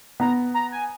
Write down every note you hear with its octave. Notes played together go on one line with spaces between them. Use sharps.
B3 A#5
A#5
G#5